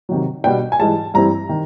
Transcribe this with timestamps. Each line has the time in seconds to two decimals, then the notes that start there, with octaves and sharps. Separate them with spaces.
0.09 C3 D#3 F#3
0.44 B2 G3 B3 D4 G5
0.72 G#5
0.79 G#2 E3 G3 A5
1.14 G2 E3 G3 C4 E4 A#5
1.49 D#3